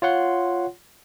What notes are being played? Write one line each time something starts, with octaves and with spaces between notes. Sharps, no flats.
F4 C#5 F#5 C6